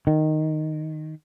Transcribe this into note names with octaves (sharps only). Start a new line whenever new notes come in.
D#3